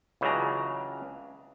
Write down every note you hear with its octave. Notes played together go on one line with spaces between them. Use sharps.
C#2 C#3 E3 F#3 D4 A#5